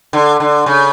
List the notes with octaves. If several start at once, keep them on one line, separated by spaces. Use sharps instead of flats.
D3
D3
C#3